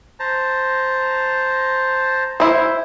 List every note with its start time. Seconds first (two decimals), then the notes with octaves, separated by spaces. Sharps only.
0.20 C5 A5 A#5
2.40 E4 C5